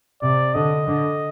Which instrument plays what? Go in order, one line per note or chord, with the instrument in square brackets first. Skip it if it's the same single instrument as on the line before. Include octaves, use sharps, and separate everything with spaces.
[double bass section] C3 [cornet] D5
[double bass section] D3 [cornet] D#5
[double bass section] D3